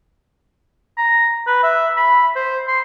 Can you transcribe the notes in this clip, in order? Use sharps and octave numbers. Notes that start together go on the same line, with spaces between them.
A#5
B4
E5
B5
C5
C6